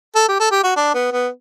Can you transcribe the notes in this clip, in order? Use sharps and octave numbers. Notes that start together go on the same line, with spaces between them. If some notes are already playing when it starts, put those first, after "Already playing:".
A4
G4
A4
G4
F#4
D4
B3
B3